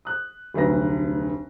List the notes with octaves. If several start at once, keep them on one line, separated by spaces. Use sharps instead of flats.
D#6 F#6
F1 D2 F#3 B4 A#6